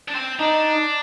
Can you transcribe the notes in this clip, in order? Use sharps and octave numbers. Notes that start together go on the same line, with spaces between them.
D4
C4
D4 D#4